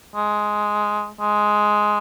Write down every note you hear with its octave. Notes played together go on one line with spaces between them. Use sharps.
G#3
G#3